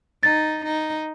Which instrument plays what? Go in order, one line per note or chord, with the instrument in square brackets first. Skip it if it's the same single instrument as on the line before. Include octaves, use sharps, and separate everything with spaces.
[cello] D#4 [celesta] A6
[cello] D#4